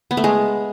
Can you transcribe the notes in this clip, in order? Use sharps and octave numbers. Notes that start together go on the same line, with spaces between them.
B3
A3
G#3